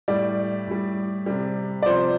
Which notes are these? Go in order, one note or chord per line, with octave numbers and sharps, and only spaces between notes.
A2 G3 D5
A2 G3
C3 G3
D5
C3 F3 C5